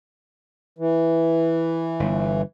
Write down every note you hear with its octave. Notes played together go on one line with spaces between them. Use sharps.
E3
G1